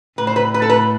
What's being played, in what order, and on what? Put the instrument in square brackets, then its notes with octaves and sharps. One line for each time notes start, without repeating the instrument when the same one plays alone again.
[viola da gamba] A2 [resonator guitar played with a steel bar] B4
[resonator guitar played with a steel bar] C5
B4
B4
A4
B4